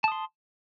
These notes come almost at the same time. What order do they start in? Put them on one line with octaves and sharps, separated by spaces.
A5 D#6 C6